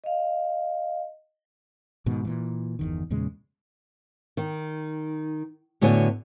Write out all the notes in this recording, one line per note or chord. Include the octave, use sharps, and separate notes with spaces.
D#5 F5
G#2 B2 D#3
A#2 E3
G1 E2 D#3
E2 A#2 C#3 G#3
D#3
A2 D3 B3 F#4 C#5 G#5